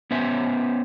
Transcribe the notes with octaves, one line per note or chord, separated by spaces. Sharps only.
B3 C#4 C5 E5